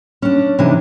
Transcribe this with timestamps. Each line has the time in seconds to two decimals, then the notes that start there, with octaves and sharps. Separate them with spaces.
0.22 C#4 D4
0.59 C3 E3 D4 D#4